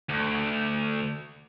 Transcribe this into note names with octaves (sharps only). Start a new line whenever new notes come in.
D2